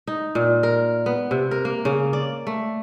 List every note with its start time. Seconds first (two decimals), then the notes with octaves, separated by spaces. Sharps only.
0.07 D#4
0.35 A#2
0.63 A#4
1.06 B3
1.31 C3
1.51 A#4
1.65 A#3
1.85 C#3
2.13 D5
2.47 A3